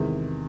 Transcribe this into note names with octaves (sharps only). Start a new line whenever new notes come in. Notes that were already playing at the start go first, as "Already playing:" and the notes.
Already playing: E2 C3 D#3 G#3